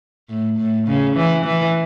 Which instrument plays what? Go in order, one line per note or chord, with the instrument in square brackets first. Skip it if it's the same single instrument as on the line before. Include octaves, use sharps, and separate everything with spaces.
[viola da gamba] A2
A2
C#3
E3
E3